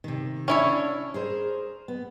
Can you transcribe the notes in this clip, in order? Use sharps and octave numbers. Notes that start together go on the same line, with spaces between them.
C3 D#3
C#4 D4 E4 C#5
G#4 A#4 C5
B3